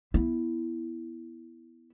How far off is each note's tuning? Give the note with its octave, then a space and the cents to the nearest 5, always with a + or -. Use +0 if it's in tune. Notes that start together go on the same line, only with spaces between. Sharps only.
B3 -5 E4 +0